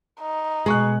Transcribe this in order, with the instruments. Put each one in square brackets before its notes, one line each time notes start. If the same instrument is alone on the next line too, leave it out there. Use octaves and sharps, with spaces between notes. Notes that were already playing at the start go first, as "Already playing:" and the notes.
[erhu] D#4
[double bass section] B2 [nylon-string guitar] G#3 [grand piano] G#4 C#6 F#6